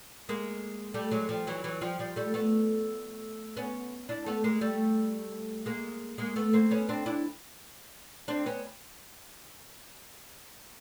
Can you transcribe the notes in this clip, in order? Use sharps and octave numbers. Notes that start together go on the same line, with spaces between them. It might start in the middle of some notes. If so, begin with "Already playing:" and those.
G#3 A#3
G3 A3
F#3 G#3
F3 G3
E3 F#3
E3 F#3
F3 G3
F3 G3
G3 A3
A3 B3
B3 C#4
D4 E4
A3 B3
G#3 A#3
G3 A3
G#3 A#3
G#3 A#3
A3 B3
A#3 C4
B3 C#4
C4 D4
D4 E4
C4 D4
B3 C#4